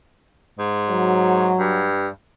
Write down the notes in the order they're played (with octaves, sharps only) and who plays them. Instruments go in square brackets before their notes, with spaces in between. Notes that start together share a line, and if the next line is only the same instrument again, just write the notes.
[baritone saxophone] G#2
[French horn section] F#3
[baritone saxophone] G2